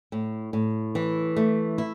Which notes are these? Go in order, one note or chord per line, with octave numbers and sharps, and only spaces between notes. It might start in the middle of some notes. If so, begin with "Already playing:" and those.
A2
A2
E3
A3
E4